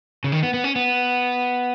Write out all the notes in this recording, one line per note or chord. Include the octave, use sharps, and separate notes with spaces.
C#3
D#3
B3
B3
C#4
B3